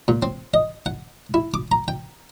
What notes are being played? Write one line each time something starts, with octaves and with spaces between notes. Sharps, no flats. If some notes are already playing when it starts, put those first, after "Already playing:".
A#2
C4
D#5
F#5
E4
D6
A#5
G5